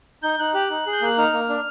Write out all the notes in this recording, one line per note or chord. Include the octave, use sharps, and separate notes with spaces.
D#4 G6
D#4 F#6
G4 F#6
D#4
G#4
G6
A#3 F#6
D#4 F6
A#3
D4